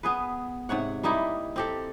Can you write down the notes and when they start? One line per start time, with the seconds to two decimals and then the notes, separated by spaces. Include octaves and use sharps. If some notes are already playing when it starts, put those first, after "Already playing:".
0.03 B3 G#4 B4
0.69 G#2 C3 C#5 F#5
1.03 G3 A#3 D#4 E4
1.56 C4 G4 A4